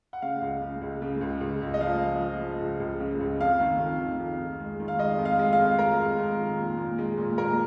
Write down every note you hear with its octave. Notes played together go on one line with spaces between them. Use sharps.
F#5
C#3 F5
C#2
C#3
C#2
C#3
C#2
C#2
C#2
D#5
F3 F5
C#3
F3
F3
C#2
C#2
C#3
C#2
F2 F5
D#3
F2
D#3
F2
F2
G#3
D#3
F5
G#3 D#5
F2
F5
G#3
F5
F2
G#3 A#4
G#3
F2
D#3
A#2
A#2
G#3
A#2
A#2 A#4